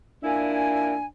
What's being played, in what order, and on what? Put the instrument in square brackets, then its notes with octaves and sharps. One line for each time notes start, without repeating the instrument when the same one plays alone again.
[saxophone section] A#2 A#3 E4 [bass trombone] D4 [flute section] G#5